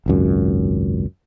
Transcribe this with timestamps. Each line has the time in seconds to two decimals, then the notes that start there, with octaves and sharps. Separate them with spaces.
0.06 G#1 C#2 F#2